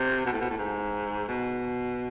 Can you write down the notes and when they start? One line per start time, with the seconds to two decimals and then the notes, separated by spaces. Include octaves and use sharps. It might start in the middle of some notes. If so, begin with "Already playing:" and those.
Already playing: C3
0.26 B2
0.32 A2
0.41 B2
0.50 A2
0.58 G#2
1.28 B2